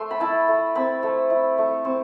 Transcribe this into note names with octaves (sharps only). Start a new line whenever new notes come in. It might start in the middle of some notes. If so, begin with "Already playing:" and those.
Already playing: A3 C6
B5
E4 A5
A3
C4 B5
A3
E4
A3
C4